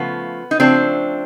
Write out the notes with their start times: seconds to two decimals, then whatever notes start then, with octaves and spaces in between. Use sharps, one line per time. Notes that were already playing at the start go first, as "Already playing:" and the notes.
Already playing: C#3 F3 A3 B3
0.51 D#4
0.60 C#3 F3 A3 C4 D4